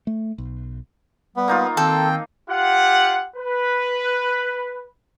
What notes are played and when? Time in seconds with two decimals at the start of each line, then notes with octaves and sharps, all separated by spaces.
0.07 A3
0.38 B1
1.37 G3 B3
1.48 A#3 D#4 F4
1.77 D#3 C4 A4 G5
2.49 F4 G4 F#5
3.36 B4